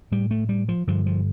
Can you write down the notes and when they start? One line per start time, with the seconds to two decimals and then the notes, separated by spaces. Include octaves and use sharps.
0.12 A2 G3
0.31 A3
0.49 G3
0.69 F3
0.87 G2 D3 F3
1.06 F3